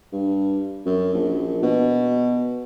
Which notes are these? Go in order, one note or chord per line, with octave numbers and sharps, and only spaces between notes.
G2
F#2
A#1
B2